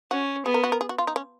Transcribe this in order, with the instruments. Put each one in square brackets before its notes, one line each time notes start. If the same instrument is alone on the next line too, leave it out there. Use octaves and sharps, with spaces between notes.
[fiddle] C#4 [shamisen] F#4
[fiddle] B3 [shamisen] G#4
[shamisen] A#4
F#4
A#4
G#4
F#4
F4
D#4
C#4